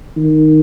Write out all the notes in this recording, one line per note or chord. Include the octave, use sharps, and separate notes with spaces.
D#3